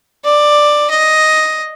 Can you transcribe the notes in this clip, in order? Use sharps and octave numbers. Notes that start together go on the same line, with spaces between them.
D5
D#5